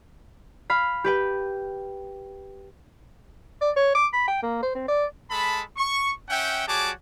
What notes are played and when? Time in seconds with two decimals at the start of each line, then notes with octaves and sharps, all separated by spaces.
0.70 F5 B5
1.04 G4 B4 G5
3.61 D5
3.76 C#5
3.94 D6
4.13 B5
4.28 G5
4.43 A#3
4.62 C5
4.75 C4
4.88 D5
5.30 G#3 A4 A5 B5
5.77 C#6
6.29 C#4 E5 F#5 G5
6.67 G3 F#4 G#4 C#5 A5 D6